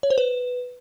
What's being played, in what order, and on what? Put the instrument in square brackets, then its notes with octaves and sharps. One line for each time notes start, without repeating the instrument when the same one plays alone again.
[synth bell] C#5
C5
B4